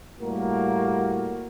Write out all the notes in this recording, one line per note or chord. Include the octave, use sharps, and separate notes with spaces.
A2 G3 A#3 F#4 A#4